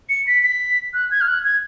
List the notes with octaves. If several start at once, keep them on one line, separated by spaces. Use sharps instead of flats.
C#7
B6
B6
F#6
G#6
F6
F#6
G#6